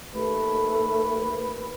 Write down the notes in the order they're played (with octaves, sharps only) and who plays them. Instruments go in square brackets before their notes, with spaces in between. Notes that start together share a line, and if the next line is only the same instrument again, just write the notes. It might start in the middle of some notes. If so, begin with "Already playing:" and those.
[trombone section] D#2 B4 [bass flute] A3